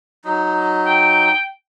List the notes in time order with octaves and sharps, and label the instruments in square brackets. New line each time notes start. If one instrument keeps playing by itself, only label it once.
[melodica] F#3 D#4
[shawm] G5